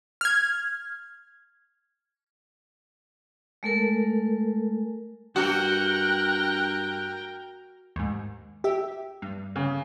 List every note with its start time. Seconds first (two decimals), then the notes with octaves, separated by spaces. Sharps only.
0.21 F6 G#6
3.63 G#3 A3 A4 A#4
5.36 G2 F#4 A#4 G5 F#6
7.96 D#2 G#2
8.64 G4 E5
9.22 G2
9.56 C#3